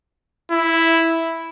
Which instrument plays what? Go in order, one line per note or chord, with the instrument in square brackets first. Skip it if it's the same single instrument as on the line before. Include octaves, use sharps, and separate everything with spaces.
[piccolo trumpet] E4